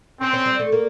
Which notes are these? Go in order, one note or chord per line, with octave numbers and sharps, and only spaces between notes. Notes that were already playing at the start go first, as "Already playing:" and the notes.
C4 C#4
C#4
G3
A3
A#3